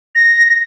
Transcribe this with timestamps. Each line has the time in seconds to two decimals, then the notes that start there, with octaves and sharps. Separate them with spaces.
0.15 A#6